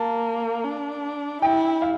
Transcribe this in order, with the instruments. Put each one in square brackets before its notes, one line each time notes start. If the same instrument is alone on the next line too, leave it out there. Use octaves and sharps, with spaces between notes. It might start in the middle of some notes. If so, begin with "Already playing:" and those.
Already playing: [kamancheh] A#3 [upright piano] A5
[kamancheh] D4
[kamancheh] E4 [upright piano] G5
[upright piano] F5